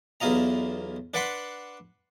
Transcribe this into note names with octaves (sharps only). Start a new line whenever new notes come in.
B1 E2 E4 F4 D#5 A#5
D4 B4 D5 F#5 B5 C6